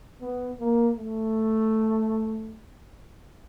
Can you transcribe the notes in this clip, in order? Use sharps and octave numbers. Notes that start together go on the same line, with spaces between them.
B3
A#3
A3